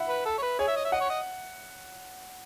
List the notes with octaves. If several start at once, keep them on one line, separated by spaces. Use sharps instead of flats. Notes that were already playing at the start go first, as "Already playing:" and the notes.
Already playing: E5 F#5 B5
B4
A4
C#5
B4
G#4 C#5
E5
D#5
E5
D#5 F#5
C#5
D#5